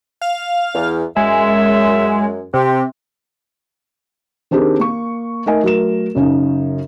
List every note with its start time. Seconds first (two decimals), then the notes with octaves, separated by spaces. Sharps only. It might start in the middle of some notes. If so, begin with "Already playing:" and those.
0.21 F5
0.74 E2
1.16 F#2 G#3 E5
2.54 C3 G4
4.51 D#3 C4 D4 G4 G#4 A#4
4.80 A#3 C#6
5.46 A3 D#4 A#4 D#5 G#5
5.63 F#3 A3 A#4 E7
6.15 F#2 C#3 C#4 D#4